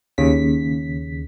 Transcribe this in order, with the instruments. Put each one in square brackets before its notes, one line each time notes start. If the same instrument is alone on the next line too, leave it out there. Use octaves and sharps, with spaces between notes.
[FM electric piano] D#2 C#3 B6